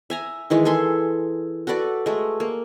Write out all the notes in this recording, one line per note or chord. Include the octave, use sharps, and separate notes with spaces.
E5 G#5 A#5
D#3 E3 G#3
G#4 A4 E5 C6
F#4 A4 B4 D5
G#3 A3
A#3